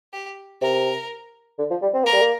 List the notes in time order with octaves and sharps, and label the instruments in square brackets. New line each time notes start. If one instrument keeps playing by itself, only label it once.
[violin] G4
[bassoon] C3 [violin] A#4
[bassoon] D3
F3
G3
C4
[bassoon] A#3 [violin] A#4
[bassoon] G3
A#3